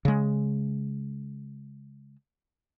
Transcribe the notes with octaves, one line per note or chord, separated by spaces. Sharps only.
C#3 G#3